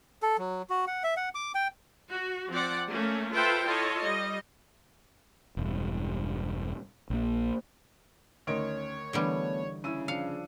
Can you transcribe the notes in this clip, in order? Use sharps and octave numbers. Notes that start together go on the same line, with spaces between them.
A4
F#3
F#4
F#5
E5
F#5
D6
G5
F#4
F3 C4 D5 F#5
A3 A#3 C#4
F4 A4 B4 C5 E5 G5
E4 F4 A4 C#5 D#5
G3 D#5
E1 G2
A#1 A#3
D2 D#3 C#4 C#5 D#5 C6 D7
D3 E3 G3 A3 B3
C#3 E4 E6 D#7
F3 D4 F5 C#7